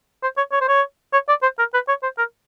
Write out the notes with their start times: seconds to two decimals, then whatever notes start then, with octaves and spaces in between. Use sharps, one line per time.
0.23 C5
0.37 C#5
0.52 C#5
0.61 C5
0.68 C#5
1.13 C#5
1.29 D5
1.42 C5
1.58 A#4
1.74 B4
1.88 C#5
2.03 C5
2.18 A#4